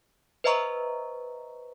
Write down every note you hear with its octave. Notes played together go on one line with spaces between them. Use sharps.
B4 C5 D#5 E5 A#5 C#6